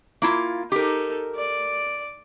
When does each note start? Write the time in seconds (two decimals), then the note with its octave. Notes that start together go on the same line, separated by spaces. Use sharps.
0.22 A#3 E4 F4
0.72 D#4 G4 A4 A#4
1.35 D5